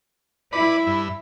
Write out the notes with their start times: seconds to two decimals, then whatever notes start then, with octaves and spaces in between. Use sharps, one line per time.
0.53 E4 B4 D5 B5
0.87 G2 E5